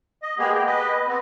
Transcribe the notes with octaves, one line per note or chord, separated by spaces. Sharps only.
D#5
G#3 A#3 B3 G4 G#4
G5
B4 D#5
B3 C4